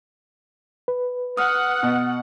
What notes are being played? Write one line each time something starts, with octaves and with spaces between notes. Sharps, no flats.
B4
F#5 D#6 F6
B2